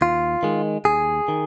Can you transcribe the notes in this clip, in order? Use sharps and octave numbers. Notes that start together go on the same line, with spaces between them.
D#2 F4
D#3 G#3
D#2 G#4
D#3